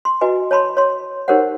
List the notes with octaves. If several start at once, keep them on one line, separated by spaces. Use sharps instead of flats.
C6
E4 F#4 B4 D#5 G#5
C#5 A5 B5 C6
C#5 C6
D#4 G4 A#4 C5 C#5 F#5